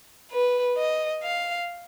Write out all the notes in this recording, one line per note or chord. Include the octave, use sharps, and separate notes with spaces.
B4
D#5
F5